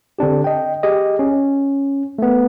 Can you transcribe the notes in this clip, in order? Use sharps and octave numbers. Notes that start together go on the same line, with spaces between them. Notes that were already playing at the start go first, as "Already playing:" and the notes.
D3 C4 D4 G4
D#5 G5
G4 G#4 D#5
C#4
A3 B3